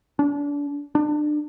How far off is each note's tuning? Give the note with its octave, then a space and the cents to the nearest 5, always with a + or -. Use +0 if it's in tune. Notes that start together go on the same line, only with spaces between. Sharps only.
D4 -30
D4 +30